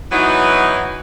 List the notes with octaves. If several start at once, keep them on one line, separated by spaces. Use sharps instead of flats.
E3 F#3 B3 D#4 E4